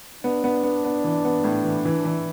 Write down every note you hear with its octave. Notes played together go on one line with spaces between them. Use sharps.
B3 D4
B3
B3
B3
E3
B3
A2
E3
E3
E3